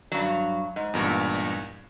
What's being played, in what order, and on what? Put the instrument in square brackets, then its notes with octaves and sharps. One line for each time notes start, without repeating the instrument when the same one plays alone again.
[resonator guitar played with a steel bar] G2 F#3
G#2
[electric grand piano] E2 G2 A#2